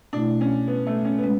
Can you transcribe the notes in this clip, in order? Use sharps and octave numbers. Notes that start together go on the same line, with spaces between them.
B2 A3 D4 E4
C#4
B3
A3
C#4
B3
G#3 C#4